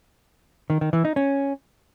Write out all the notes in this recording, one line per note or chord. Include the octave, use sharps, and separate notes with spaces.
D#3
D#3
E3
D#4
C#4